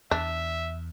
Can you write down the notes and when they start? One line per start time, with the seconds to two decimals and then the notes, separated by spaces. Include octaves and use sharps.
0.11 E2 D4 E5